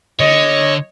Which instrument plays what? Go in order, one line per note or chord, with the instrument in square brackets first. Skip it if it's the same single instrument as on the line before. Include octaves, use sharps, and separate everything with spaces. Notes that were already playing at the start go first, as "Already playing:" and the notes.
[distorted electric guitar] D3 [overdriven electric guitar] C#5 [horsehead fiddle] D#5